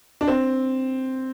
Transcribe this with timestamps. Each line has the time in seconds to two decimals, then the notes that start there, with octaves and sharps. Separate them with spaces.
0.21 D4
0.28 C4